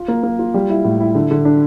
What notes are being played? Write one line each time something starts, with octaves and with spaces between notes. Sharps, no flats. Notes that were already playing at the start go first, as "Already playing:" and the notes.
Already playing: F4
A#3
A#3
F4
G3
E4
A2
E4
D3
D3
D4